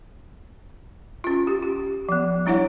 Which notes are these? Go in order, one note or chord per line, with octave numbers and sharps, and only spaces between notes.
C#4 F4
G4
G4
F3 B3
G3 D4 E4 C#5 F#5